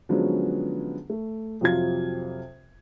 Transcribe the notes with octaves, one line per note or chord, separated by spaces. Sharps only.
D3 F3 F#3 G#3 B3 C#4
A3
F2 C3 F#3 F4 G#6